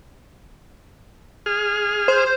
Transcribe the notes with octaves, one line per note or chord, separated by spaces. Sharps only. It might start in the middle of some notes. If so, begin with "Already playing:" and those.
G#4 F6
C5